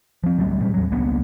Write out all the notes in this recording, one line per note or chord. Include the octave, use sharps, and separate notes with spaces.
F3 C4
D2 F#3 G3 C4
A#2 G3 G#3
E2 F#3
C#2 A#3 B3 D4